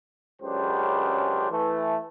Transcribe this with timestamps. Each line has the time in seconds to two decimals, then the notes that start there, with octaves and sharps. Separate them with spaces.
0.41 C#2 F#2 C#3 D4 G4 C5
1.50 E3 A3